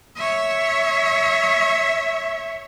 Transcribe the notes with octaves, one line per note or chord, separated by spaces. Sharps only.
C#5 E5